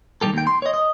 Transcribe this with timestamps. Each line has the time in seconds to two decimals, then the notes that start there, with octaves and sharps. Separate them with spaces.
0.21 D#3 F#3 G3 G4 A4
0.34 D#2 G5
0.47 C6
0.62 C#5 D#5
0.74 D#5